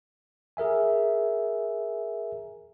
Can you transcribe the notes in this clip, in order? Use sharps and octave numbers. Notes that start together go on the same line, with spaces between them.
G#4 A#4 E5 G#5